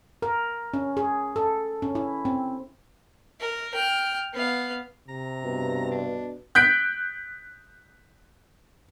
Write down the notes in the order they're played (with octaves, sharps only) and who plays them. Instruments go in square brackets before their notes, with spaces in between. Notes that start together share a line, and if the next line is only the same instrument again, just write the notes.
[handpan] A#4
C#4
G#4
A4
C#4
E4
C4
[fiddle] A#4
G5 F6
B3 F5
[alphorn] C3 [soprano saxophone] A#5
[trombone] G2 [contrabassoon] B2
[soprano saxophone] D4
[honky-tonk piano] F#6 G6 B6 D7